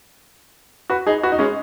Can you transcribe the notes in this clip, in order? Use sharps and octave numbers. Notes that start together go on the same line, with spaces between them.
F#4 B4
D#4 G#4
F#4 B4
D#4
G#3 C#4